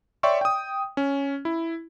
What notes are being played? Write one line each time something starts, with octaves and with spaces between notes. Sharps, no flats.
C#5 D5 E5 G5 C6 C#6
G5 D#6
C#4
E4